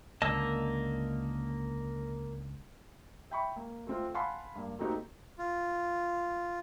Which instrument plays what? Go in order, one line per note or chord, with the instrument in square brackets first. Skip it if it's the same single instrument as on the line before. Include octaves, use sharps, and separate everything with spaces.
[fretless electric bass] C#2 D3 [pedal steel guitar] A#3 E6 [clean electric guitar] D#5 A5
[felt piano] E5 G5 B5 C#6
A#3
A3 C4 F4
F5 F#5 G#5 A5 B5 C6
G2 A#3
A3 A#3 C4 D#4 F#4 G4
[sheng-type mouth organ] F4